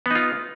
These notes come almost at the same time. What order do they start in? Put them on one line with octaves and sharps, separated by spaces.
B3 D#4 F4